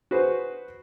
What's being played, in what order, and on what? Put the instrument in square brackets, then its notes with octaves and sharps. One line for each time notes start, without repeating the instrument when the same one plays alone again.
[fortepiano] F#4 G#4 B4 C5